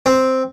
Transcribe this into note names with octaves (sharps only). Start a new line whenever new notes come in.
C4